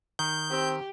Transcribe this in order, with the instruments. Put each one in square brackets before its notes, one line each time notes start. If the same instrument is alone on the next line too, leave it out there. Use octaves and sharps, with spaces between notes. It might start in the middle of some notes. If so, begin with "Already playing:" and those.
[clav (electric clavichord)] D#3 [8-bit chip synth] G6
[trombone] C4 [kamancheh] G4